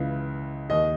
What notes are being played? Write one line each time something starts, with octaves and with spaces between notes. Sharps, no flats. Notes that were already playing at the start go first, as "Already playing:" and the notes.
Already playing: C#2 C#3 E3
D#2 D#3 D#5